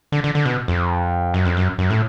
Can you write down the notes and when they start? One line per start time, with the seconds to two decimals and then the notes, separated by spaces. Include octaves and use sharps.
0.12 D3
0.24 D3
0.35 D3
0.46 B2
0.68 F2
1.34 F#2
1.45 F2
1.57 F#2
1.78 F#2
1.90 A2